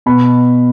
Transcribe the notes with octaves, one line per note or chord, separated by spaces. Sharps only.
B2 B5